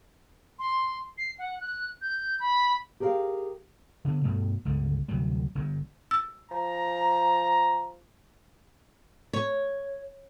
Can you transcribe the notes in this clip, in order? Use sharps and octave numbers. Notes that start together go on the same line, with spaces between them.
C6
C7
F#5
F#6
G6
B5
G4 G#4 A#4 B4 F5 G5
D3 B3
G2 B2 G3 A3
G1 C#2 D3 G#3
D2 C3 F#3 G3
G1 G2
E6
F3 A#5
C#5